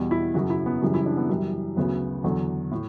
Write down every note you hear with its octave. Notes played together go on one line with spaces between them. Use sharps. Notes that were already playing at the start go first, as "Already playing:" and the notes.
Already playing: E2 B2 G3
E4
F#2 C#3 F#3 F#4
E4
B3
F#2 C#3 E3 G3
E4
D4
B3
F#2 E3 G3
D2 C#3 F#3 B3
E2 D3 F#3
A2